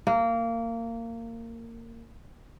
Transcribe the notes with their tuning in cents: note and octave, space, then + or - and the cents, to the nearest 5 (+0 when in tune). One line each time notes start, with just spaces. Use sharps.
A#3 -20